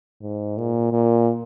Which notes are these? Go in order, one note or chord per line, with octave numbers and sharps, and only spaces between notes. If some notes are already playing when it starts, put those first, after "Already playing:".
G#2
A#2
A#2